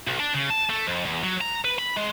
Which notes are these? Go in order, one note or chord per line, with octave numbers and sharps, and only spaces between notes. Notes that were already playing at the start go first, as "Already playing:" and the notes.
B1
D4
C#3
A5
A3
F2
E2
F#3
A#5
B4
B5
G#3